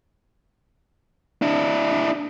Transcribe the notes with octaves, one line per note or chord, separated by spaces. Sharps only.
D4 E4